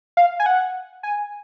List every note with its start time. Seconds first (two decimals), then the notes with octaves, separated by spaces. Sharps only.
0.17 F5
0.40 G#5
0.46 F#5
1.03 G#5